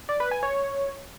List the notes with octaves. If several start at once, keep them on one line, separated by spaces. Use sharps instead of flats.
D5
B4
G#5
C#5